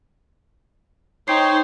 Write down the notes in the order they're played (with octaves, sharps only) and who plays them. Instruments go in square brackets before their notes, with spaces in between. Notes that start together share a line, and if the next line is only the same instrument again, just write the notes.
[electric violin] D#4 C5 [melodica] C#5 C6 [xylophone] G5 C7